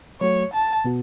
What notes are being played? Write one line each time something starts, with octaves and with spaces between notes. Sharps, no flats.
F#3 A3 F#4 C#5
A5
B2 B3 F#4